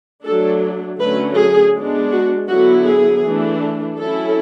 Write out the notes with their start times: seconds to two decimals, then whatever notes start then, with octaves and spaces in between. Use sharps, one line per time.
0.24 F#3 A3 D4 A4
0.99 D3 F#3 A3 C#4 B4
1.37 G#4
1.74 G#3 B3 D4
2.11 F#4
2.49 D3 F#3 B3 E4 F#4
2.86 G#4
3.24 E3 A3 D4
3.98 F#3 C#4 E4 A4